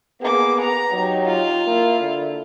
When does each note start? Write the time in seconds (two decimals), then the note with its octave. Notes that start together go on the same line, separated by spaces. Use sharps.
0.21 A#3 B3 G#4 D6
0.61 F#5 A#5
0.93 F#3 D#4 G4
1.26 F4
1.67 A#3 E4
2.00 D3